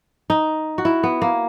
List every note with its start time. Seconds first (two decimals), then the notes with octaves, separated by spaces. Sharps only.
0.30 D#4
0.78 F#4
0.85 E4
1.03 B3
1.22 A#3